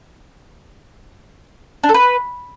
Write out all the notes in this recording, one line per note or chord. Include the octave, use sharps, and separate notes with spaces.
D4
A4
B4